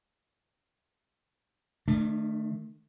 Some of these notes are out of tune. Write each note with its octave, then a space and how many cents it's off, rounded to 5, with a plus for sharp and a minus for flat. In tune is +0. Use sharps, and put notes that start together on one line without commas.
D#3 -25 A3 +0 D4 +25